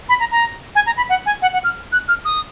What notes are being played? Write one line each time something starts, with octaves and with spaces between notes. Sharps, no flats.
B5
A#5
A#5
G#5
A#5
B5
F#5
G#5
F#5
F#5
F6
F#6
F6
D#6